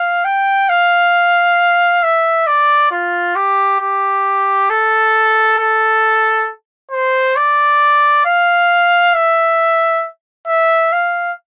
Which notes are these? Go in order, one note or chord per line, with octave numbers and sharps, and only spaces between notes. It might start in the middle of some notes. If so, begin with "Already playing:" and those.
Already playing: F5
G5
F5
E5
D5
F4
G4
G4
A4
A4
C5
D5
F5
E5
E5
F5